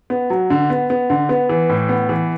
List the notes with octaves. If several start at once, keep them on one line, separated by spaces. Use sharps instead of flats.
B3
F#3
D3
B3
B3
D3
B3
E3
A2
B3
E3